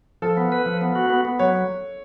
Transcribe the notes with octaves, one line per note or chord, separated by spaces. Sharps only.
F3 A4
B3
B4
F3
B3
F#4
B3
B3
F#3 C#5